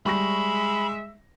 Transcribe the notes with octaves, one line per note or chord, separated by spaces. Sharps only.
G3 G#3 E5 B5 C#6 A#6